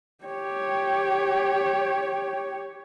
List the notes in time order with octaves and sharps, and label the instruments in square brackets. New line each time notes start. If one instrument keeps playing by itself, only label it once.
[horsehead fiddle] G4 C#5